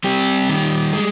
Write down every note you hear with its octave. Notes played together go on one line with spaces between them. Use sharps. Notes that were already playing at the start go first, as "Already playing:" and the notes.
G3 C4 G4
D#3
G#3